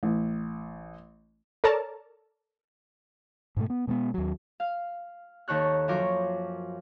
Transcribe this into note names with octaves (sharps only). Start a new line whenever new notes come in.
A1
A4 A#4 C#5 D5 A5 A#5
G#2 B2 A3
B3
B2 G#3 A3 B3
D#2 F#3
F5
D#2 D#3 A4 C#5 F#6
F#2 F3 F4 A#4 C#5 D6